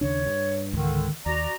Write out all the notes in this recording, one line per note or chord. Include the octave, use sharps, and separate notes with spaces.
D#2 C#3 D4 C#5
G2
C#2 G#2 D3 D#3
D#2 F#4 D5 A#5